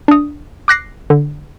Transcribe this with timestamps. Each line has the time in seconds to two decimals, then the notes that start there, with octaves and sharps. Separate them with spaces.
0.08 D4 D#6
0.68 D6 F#6 A#6 C7
1.10 D3